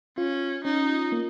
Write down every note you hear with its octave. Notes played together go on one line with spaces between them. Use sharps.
C#4 F4
C#4 D#4
A#3